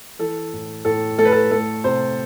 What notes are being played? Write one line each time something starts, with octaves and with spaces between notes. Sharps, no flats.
E3 A4
A2
A2 A4
A3 A4
B4
A4
A3 A4
C3 C5